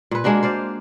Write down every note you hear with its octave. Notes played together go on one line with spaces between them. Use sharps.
A#2 B4
G#3 A#3 D4 F#4
C5 D5 F5